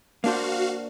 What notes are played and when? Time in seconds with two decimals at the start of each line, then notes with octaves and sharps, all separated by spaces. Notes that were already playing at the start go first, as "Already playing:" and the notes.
0.24 A#3 D4 F#4 C5 F5